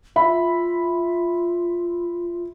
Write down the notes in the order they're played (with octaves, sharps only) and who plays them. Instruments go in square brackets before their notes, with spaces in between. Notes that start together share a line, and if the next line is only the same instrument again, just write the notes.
[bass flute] F4 [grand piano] E5 B5